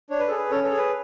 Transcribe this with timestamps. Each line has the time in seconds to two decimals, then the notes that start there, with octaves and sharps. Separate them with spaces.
0.10 D4 C#5
0.19 B4
0.28 G#4 A4
0.37 B4
0.51 C#4 A4 C#5
0.64 A4 C#5
0.71 G#4
0.78 B4